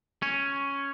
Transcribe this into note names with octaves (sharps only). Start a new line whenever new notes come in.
C#4